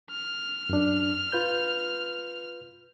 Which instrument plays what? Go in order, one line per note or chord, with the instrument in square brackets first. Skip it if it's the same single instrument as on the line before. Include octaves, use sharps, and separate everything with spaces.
[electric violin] F6
[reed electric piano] F#2 D4
F4 B4 G6